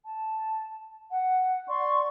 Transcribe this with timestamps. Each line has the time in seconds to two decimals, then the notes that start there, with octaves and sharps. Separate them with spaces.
0.05 A5
1.10 F#5
1.69 D5 C6 C#6